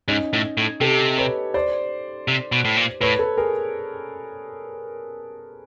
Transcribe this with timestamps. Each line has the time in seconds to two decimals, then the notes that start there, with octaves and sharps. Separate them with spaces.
0.08 G#2 C#4 D#4
0.33 A2
0.58 A2
0.81 C3 G4 A4
1.18 B4 C#5
1.54 C5 D5
2.28 C3
2.52 B2
2.65 A2
2.77 A#2
3.01 A2 B4 C#5
3.19 A4 B4
3.38 G#4 A#4